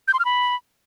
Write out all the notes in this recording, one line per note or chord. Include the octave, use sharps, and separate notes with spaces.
G6
C6
F6
B5